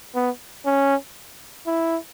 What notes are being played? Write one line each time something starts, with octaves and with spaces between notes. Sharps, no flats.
B3
C#4
E4